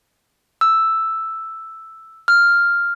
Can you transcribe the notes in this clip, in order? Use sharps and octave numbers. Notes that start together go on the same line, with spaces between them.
E6
F6